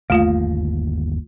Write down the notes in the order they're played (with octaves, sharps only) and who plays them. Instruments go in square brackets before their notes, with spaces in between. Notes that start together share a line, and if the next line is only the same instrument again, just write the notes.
[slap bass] G1 D#2 A#3 [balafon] A3 F4 F5